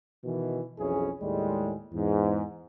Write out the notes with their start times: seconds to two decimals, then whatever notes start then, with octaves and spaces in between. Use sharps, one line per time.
0.25 B2 D#3 E3
0.79 B1 F2 E3 C#4 G#4
1.21 D#2 A2 G3 G#3
1.93 E2 G#2